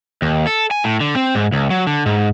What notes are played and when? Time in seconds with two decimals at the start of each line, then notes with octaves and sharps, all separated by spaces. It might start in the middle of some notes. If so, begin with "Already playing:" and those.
0.22 D#2
0.47 A4
0.71 G#5
0.84 A2
1.01 D3
1.16 C4
1.35 G#2
1.52 C#2
1.70 F#3
1.87 D3
2.06 G#2